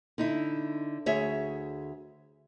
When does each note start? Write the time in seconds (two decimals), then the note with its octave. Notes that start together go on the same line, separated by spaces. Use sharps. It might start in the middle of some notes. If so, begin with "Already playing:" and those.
0.18 D3 D#4 E4
1.06 D2 G#4 C#5 E5